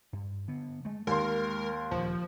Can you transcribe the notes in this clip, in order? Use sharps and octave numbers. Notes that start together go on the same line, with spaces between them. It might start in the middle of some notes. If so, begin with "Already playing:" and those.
G2
D3 B3
G#3 A3
D#2 G#3 A#4 C6
D#1 D2 F3